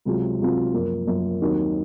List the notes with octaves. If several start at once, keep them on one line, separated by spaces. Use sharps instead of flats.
C#2 C3 F#3 C4 F4
C#2 C3 F#3 C4 F4
F#2 F3 A#3
F#2 F3 A#3
D#2 D#3 F#3 C4